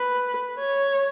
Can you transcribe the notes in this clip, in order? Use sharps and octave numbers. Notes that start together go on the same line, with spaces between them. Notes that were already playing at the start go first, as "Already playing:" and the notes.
Already playing: B4
C#5